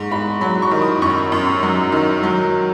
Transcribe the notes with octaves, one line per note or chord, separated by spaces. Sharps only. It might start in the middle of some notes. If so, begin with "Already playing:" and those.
Already playing: G#2 C#6
G#2 B5
F#3 B5
C#6
D#3
D#6
F#2 C#6
F#2
F#3
D#3
F#3